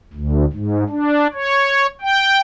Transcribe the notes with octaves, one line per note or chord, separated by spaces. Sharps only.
D2
G#2
D4
C#5
G5